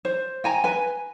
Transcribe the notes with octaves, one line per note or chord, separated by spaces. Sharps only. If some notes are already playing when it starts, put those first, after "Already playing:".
C5
G5 G#5 A#5
B4 G#5